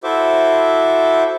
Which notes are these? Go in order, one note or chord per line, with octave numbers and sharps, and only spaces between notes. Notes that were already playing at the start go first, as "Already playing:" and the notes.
E4 F#4 A4 C5 E5 D6